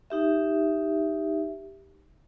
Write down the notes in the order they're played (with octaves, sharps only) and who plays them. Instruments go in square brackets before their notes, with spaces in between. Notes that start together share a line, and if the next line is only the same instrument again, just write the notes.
[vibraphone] D#4 G4 E5